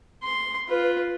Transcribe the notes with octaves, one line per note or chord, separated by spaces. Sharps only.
C6
F4 B4